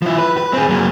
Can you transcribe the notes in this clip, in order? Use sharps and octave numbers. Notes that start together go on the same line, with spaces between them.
F3 E4
B4
B4
C4 G#4
F#3 A#3